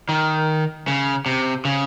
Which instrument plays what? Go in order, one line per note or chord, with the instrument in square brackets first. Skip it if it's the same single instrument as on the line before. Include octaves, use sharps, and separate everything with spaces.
[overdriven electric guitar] D#3
C#3
C3
C#3